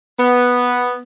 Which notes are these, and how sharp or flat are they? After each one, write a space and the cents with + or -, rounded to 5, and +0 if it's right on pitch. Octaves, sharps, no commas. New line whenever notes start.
B3 -5